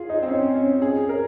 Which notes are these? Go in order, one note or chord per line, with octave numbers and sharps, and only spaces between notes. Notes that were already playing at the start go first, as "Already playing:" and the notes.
Already playing: F4 G#4
D#4
C4
C#4
C#4
G#4
A#4